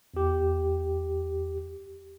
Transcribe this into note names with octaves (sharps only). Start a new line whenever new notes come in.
E2 G4